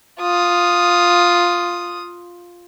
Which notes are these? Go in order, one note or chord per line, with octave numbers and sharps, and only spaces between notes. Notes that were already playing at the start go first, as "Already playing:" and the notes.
F4 D#6